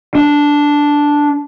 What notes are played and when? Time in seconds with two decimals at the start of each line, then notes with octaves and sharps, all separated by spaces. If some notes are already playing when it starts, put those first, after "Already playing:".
0.15 D4